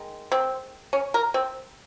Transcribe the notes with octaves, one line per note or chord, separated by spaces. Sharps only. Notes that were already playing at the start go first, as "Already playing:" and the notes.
Already playing: D#3 G#3
C4
C#4
A#4
C4